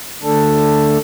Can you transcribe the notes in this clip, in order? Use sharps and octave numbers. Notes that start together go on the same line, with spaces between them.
D3 A3 D4 A4